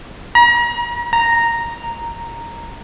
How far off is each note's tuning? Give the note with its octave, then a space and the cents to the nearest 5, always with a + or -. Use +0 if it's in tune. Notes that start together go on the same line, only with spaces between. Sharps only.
A#5 +40
A#5 -5